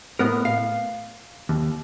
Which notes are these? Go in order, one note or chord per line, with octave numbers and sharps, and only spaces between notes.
A2 B3 A#4
F5
D#2